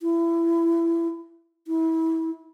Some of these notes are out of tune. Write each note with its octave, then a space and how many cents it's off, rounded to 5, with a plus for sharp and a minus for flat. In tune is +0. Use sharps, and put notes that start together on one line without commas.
E4 +25
E4 -25